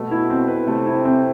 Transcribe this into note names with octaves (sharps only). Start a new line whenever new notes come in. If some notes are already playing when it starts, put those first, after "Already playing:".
Already playing: B2 A3
E4
C4
B4
C3 A3
E4
C4